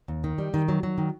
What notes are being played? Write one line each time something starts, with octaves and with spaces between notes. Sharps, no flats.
D#2
D#3
G3
D#3
F#3
F#3
D#3